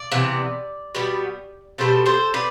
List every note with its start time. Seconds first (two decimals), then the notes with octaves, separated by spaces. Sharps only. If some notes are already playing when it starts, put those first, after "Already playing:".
Already playing: D5
0.12 C3 E3 B3
0.95 B2 G3 B3
1.78 B2 G3 B3 A4 C5
2.06 A4 C5
2.34 B4 D5